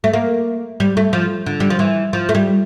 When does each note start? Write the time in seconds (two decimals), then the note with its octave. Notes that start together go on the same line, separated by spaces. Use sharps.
0.04 A3
0.13 A#3
0.80 G3
0.97 A3
1.13 F3
1.46 D3
1.60 G3
1.70 F3
1.79 E3
2.13 F3
2.29 A3
2.35 G3